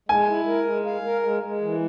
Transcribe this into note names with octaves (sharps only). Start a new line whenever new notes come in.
G#3 G#5
E4
A#4
G#3
F5
A#4
G#3
G#3
E3